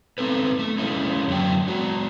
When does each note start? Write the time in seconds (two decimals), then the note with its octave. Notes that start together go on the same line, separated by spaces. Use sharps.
0.18 B3 C4 A4 B4
0.59 A3
0.78 G#3 A#3 C#4 E4
1.28 F#2 D3 F#3 G5
1.68 G#3 F#4